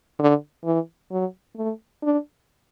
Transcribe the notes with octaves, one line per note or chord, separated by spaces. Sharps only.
D3
E3
F#3
A3
D4